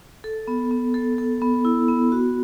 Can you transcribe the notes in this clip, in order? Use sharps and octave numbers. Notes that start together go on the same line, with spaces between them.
A4
B3
B3
A4
A4
B3
E4
B3
F#4